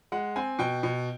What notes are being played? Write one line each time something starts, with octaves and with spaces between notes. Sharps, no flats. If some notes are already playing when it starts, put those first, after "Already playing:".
G#3 F#5
C4 G#5
B2 G5
B2